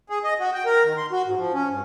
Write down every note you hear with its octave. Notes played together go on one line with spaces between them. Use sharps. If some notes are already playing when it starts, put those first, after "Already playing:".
G#4
D#5
F#4
G5
A#4
D#3
C6
F#4
G#2
F3
C#4
G2